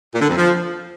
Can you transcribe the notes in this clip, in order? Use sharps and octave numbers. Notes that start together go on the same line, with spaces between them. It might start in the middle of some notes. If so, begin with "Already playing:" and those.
A#2
D3
F2
F3